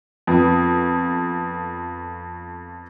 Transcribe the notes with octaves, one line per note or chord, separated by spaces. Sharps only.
F2 B3